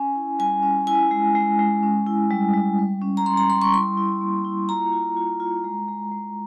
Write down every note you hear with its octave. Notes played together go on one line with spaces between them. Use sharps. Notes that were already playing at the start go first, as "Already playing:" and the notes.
Already playing: C#4 G#5
E4
G3 G#5
C#4
E4 G#5
G#3
G#3
G#3
C#4
E4
G3
G3
G3
C#4
A#5
C#4 C6
A#5
G3 C6
C#6
E4 C6
E4
A#3
E4
F4 A#5
F4
F4
F4
G#3
G#3
G#3